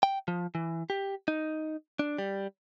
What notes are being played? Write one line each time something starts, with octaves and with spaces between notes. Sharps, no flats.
G5
F3
E3
G4
D#4
D4
G3